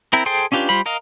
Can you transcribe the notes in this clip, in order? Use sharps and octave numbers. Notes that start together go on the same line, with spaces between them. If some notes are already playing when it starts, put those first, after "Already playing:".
C4 E4 A#4
G#4 A4 C5 G5 C6
C#4 D4 F4 G4 B4
G3 F4 C5 B5
A#4 D#5 F5